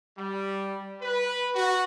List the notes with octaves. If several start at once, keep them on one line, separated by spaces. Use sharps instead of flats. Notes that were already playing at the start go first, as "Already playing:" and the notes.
G3
B4
F#4